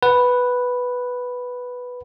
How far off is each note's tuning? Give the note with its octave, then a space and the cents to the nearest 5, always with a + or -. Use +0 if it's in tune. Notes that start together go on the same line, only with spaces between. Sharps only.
B4 +0 F#5 +0